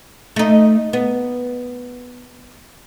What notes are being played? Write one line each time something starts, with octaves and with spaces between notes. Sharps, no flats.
A3 D#4
B3